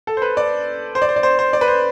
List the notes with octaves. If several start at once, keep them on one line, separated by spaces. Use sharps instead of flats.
A4
C5
B4
D5
C5
D5
C5
D5
C5
C5
D5
B4
C5